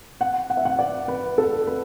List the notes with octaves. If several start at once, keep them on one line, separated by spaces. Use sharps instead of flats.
F#5
F#5
E5
F#5
D5
B4
A4
B4